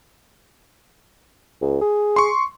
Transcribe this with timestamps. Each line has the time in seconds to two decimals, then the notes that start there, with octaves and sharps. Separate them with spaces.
1.61 C#2
1.81 G#4
2.16 C6 C#6